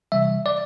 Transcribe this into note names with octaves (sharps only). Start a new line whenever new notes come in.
C3 E3 G3 E5
D5